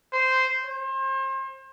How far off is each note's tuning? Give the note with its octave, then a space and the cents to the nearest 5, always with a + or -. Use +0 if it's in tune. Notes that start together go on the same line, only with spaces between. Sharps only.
C5 -10
C5 +35